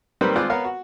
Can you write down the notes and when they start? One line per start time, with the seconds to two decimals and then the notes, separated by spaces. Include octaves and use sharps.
0.21 D#3 G3 A#3 C4 B4 C5
0.36 G#1 G#3 F4 C5 D5 F#6
0.50 B3 A#4 C#5 F5 A#5
0.64 F#4